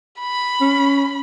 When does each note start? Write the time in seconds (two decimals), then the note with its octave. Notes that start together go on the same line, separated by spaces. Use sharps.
0.20 B5
0.61 C#4